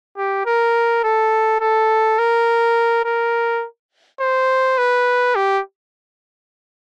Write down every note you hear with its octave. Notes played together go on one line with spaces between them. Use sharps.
G4
A#4
A4
A4
A#4
A#4
C5
B4
G4